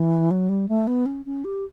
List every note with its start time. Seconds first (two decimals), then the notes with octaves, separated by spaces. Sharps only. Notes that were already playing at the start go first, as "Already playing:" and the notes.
Already playing: E3
0.31 F#3
0.49 G3
0.69 A3
0.87 B3
1.06 C#4
1.26 C#4
1.45 G4